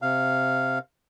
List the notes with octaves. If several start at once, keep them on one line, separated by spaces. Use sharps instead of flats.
C3 F5